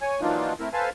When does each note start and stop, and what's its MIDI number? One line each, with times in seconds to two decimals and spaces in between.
0.01 0.21 73
0.01 0.21 80
0.21 0.53 52
0.21 0.53 54
0.21 0.53 58
0.21 0.53 62
0.21 0.53 63
0.21 0.53 65
0.60 0.69 57
0.60 0.69 60
0.60 0.69 64
0.60 0.69 70
0.73 0.90 69
0.73 0.90 71
0.73 0.90 72
0.73 0.90 77
0.73 0.90 80
0.73 0.90 81